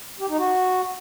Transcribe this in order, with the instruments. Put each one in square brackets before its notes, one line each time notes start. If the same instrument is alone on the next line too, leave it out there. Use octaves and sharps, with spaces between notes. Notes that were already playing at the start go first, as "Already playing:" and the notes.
[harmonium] G4
D#4
F#4